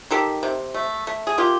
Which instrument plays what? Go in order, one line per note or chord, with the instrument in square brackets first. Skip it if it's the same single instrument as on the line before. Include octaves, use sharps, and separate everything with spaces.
[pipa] D#3 G4 A4
C3
A3
A3
G#4
A#3 F4 G4